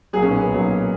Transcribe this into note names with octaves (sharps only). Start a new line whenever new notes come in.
B1 A#2 F#3 G#4
C#4
B3
B1 A#2 F#3